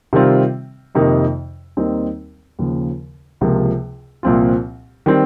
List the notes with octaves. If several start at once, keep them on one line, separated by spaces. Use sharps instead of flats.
C3 D#3 G3 C4 F4
F2 C3 D#3 A#3 D#4
D#2 D#3 G3 C4 D#4
D#2 C#3 F3
C#2 C3 F3 A#3
C2 A#2 F3 C4 F4
D#3 G3 C4